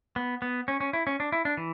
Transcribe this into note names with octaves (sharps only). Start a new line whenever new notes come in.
B3
B3
C#4
C#4
E4
C#4
D4
E4
D4
E3